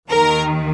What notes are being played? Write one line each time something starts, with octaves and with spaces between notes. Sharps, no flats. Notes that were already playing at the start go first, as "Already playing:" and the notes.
D#2 D#3 A#4